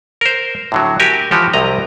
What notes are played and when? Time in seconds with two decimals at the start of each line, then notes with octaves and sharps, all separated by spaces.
0.21 A#4 C5
0.72 A2 D3 F#3
1.00 F#4 G4 A#4 G#5
1.31 E3 F3 F#4 G4
1.53 C2 C3 F#3 D#5 A#5